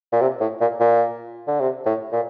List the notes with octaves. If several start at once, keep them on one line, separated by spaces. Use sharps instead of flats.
A#2
C3
A2
A#2
A#2
D3
C3
A2
A#2